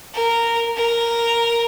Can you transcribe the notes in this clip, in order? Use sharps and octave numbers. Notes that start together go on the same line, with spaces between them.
A#4
A#4